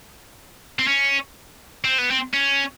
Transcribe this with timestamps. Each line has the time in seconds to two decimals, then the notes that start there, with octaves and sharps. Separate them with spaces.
0.79 C4
0.87 C#4
1.84 C4
1.98 B3
2.11 C4
2.34 C#4